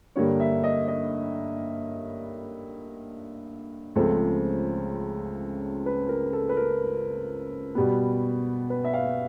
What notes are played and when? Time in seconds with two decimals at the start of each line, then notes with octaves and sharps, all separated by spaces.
0.16 G2 D3 G3 A#3 C#5
0.40 E5
0.64 D#5
0.88 D#5
3.96 C#2 C#3 F3 A3 C4 A4
5.86 B4
6.09 A#4
6.33 A4
6.49 B4
6.57 A#4
7.75 B2 G3 B3
8.70 B4
8.84 E5
8.93 F5